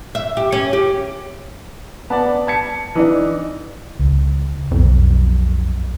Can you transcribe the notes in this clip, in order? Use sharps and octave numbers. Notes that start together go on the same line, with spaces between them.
E5
G4
C#4
G4
B3 D5 A5
A5 G#6 C#7
E3 D4 D#4
C#2
B1 F2